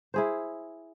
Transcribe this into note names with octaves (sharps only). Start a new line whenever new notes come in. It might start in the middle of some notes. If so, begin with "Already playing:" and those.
E4 G#4 C5